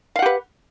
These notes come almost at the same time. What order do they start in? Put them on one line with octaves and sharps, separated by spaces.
F5 F#5 G4 B4